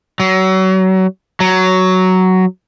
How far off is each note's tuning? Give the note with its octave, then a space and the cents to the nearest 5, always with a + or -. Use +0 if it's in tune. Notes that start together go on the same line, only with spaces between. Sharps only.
F#3 +30
F#3 +5